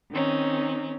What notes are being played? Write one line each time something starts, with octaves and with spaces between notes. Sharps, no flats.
D#3 C4 C#4 D#4